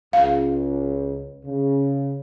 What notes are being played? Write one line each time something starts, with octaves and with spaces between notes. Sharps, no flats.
C#2 F5
C#3